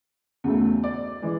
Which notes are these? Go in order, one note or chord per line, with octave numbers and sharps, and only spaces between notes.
E2 C#3 F#3 A3
D5
E3 G#3